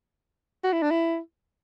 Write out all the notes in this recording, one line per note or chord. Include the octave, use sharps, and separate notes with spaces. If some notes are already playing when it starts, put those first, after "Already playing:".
F#4
E4
D4
E4